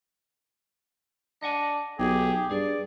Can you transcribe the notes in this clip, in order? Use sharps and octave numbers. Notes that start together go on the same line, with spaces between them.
D4 D#5 F#5 G#5
B1 G4 G#4
G2 G#4 D5